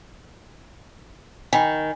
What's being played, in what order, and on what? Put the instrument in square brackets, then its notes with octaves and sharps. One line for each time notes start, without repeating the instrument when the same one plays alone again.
[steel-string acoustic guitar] D#3 [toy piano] G#5 B5